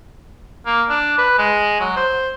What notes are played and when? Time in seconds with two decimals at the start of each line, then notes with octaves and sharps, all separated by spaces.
0.66 A#3
0.89 D4
1.18 B4
1.38 G#3
1.80 F#3
1.97 C5